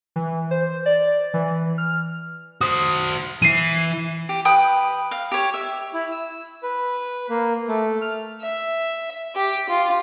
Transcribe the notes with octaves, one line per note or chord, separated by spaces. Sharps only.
E3
C5
D5
E3
F6
F#4 C5 D#6
E3 E4 C7 D#7
G4
B4 G5 D#6
F5
G4 C#5
E5
E4
E6
B4
A#3
A3
F6
E5
G4
F4